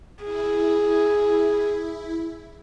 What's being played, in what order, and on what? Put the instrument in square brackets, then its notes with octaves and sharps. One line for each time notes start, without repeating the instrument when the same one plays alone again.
[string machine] E4 [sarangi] G#4